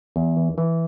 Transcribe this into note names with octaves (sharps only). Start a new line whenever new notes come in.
E2
E3
E3